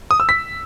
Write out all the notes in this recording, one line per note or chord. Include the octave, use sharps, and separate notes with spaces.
D#6
E6
B6